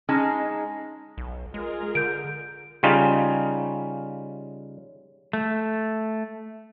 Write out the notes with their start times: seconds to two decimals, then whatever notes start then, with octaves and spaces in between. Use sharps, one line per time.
0.09 G#3 C#4 D#4 A5
1.18 B1
1.54 G#3 F4 G#4 A#4
1.95 D3 G6 D7
2.83 C#3 G3 C#4 D#4 F4
5.33 A3